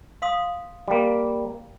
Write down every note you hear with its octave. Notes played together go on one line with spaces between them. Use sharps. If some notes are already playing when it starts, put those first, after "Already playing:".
F5 C6 D#6
G3 A#3